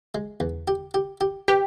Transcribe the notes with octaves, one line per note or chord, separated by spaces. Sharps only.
G#3
E2
G4
G4
G4
G4 B4